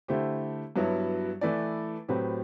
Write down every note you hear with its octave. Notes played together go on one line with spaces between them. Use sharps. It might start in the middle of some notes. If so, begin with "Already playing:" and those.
D3 A3 E4 G4 C5
G2 F#3 B3 E4
E3 A3 E4 B4 D5
A2 F#3 C4 G4 B4